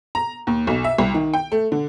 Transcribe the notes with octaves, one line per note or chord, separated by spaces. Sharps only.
A#5
D#2
B1
E5
C2
D#3
G5
A3
D3